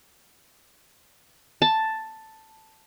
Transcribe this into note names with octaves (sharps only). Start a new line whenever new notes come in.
A5